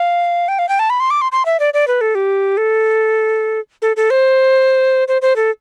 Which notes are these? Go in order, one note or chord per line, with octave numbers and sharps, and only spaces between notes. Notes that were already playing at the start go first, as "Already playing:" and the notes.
Already playing: F5
G5
F5
G5
A5
B5
C6
D6
C6
C6
E5
D5
D5
B4
A4
G4
A4
A4
A4
C5
C5
C5
A4